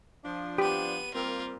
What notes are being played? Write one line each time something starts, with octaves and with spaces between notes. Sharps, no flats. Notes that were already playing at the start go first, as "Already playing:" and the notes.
F3 D4
B3 G4 D#7
G3 A#3 C4 F4 A#4